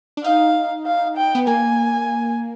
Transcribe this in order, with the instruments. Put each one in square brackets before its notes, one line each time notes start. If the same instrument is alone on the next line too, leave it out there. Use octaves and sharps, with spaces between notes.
[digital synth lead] D4
[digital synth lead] D#4 [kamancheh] F5
[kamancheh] F5
G5
[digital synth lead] B3
[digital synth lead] A#3 [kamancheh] G#5